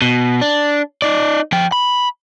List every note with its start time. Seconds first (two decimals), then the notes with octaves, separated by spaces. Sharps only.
0.02 B2
0.41 D4
1.02 D#4 D5
1.52 F3 G5
1.72 B5